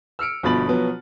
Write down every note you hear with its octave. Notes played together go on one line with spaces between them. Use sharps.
E6 F6 C#7 D7
G1 B2 F3 B5 A6 F#7
B2 F3 F#3 B3